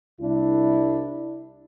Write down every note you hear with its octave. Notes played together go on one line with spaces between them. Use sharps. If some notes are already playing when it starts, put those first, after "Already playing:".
C2 D4 E4